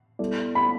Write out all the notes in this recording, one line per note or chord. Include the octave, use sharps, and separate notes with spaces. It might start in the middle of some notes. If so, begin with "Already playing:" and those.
G3 B3 E4 A4 D5
B5